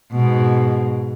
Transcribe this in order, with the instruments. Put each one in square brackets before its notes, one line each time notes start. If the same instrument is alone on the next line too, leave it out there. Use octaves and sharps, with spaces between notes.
[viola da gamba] G#2 B2